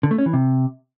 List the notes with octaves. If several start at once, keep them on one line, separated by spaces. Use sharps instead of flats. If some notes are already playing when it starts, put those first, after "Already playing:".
D3
A3
C#4
E3
C3